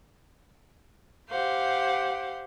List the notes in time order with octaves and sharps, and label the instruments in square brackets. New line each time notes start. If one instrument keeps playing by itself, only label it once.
[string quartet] G4 C5 F5 F#5